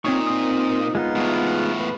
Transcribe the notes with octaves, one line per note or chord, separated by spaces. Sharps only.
A#2 C4 D#4 C#5 C#6
C4 D#6
G#3 B3 D#4 F4
E2 A2
B4